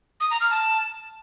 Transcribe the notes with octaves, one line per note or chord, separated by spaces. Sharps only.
D#6
A#5
F6
A5